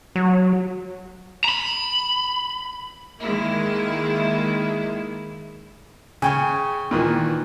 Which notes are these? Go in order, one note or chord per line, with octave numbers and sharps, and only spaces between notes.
F#3
A#5 B5
D#3 G#3 A#3 E4
C#3 C#5 G5 G#5
A#2 D#3 E3